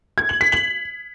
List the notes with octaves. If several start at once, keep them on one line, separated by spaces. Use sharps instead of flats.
G#6
F#7
B6
F#7